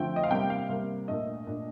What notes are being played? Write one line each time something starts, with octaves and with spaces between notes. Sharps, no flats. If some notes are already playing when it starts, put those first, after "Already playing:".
Already playing: D3 F3 A3 C4 G5
D#5
F5
C3 G3 A#3 G5
F5
C3 G3 A#3
A#2 A3 D4 D#5
A#2 A3 D4